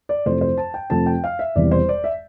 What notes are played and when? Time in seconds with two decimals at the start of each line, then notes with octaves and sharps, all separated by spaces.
0.09 D5
0.26 F2 C3 E3 A3 C5
0.41 C5
0.58 A5
0.74 G5
0.90 F2 C3 F3 A3 A5
1.06 G5
1.24 F5
1.39 E5
1.55 E1 E2 C3 E3 G3 D5
1.71 C5
1.89 D5
2.04 E5